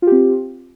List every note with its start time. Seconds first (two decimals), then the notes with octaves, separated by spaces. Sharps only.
0.02 F4
0.07 G4
0.12 C4